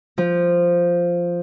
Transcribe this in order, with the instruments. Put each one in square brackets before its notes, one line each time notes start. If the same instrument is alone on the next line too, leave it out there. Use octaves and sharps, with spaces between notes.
[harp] F3